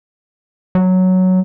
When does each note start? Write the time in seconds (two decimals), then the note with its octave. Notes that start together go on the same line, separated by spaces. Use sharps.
0.75 F#3